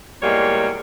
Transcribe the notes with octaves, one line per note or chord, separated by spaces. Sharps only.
E2 A#2 G3 G#3 A#3 C#5